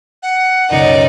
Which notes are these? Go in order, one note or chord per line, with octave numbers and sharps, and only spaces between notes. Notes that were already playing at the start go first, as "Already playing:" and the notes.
F#5
C#2 F#2 B2 D#4 D5